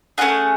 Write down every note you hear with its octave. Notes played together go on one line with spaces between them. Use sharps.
A3 C#4 F4 G#4 F#5